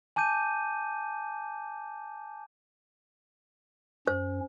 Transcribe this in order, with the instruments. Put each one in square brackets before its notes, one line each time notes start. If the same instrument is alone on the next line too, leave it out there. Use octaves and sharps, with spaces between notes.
[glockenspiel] G#5 A5 D6 G6 D#7
[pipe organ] F#2 C#4 [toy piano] C5